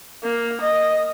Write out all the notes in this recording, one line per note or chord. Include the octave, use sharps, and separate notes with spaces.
A#3
D#5